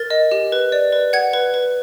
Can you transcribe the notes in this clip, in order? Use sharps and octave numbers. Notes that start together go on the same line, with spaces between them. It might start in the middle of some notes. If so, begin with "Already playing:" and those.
Already playing: A#4 A6
D#5
G4
B4
D5
B4
F#5 G#6
B4
B4